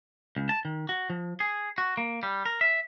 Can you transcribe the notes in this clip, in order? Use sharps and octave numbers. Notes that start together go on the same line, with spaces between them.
C#2
A5
D#3
F#4
F3
G#4
F#4
A#3
G3
A#4
E5